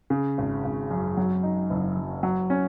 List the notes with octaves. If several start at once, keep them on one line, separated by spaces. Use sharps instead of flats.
C#3
G#1
G#1
F#2
F#3
D#4
F#1
F#2
F#3
C#4